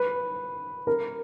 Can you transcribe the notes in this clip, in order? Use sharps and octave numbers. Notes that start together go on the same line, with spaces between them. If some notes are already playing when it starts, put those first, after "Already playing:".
Already playing: B4
A#4